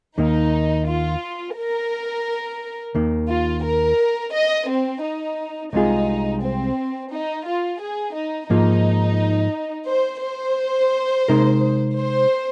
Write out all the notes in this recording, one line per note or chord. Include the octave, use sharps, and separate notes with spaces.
D#2 D#3 A#3 D#4
F4
A#4
D#2 D#3 A#3
F4
A#4
D#5
C4
D#4
C2 C3 G#3 D#4 F4 G#4
C4
D#4
F4
G#4
D#4
G#2 F3 A#3 D#4 F4
C5
C5
C3 G#3 D#4 A#4
C5